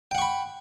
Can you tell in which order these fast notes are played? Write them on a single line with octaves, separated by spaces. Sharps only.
G5 F#5 C#6 B5